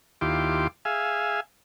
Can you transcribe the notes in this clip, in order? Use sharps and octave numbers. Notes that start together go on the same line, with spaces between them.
D#2 E4 F4 G4 C6 D6
G#4 E5 F5 G#5